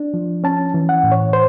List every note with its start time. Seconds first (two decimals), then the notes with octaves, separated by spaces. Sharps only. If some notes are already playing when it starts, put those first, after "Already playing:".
Already playing: D4
0.14 F3
0.44 C#4 A5
0.74 E3
0.89 F#5
1.04 A2
1.12 C#5
1.33 C5